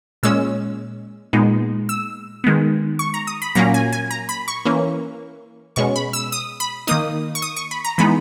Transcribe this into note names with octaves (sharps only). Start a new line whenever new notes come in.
A#2 G#3 C#4 E6
A#2 G#3 B3 D#4
E6
D#3 G#3 B3
C#6
A#5
D#6
B5
A#2 F#3 A#3 C#4 A#5
G#5
G#5
A#5
B5
C#6
E3 A#3 C#4
B2 G#3 C#4 C#6
B5
E6
D#6
B5
D#3 A#3 D#4 D#6
C#6
D#6
C#6
B5
A#5
E3 G#3 B3 D#4 B5